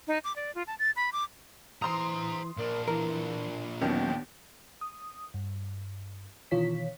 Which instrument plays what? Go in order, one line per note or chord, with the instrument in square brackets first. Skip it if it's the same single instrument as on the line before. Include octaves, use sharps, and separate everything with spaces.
[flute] D#4
D6
D5
F4
A5
A6
B5
D6
[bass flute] E3 [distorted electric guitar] C5 A#5 [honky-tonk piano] C6 D#6
[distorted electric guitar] A#2 D4 [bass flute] A#4
[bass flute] E3 [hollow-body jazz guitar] A#4
[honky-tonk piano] D#2 D#3 [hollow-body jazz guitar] F#3 C#4 [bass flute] B3
[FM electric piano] D#6
G2
B2 D#3 E3 F4 C#5 B6